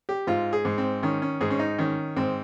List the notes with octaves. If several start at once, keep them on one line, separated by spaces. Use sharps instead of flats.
G4
G#2 F4
G#4
G#2
C4
D#3 C#4
C#4
G#2 G#4
C#4
D#4
D#3 C#4
G#2 C4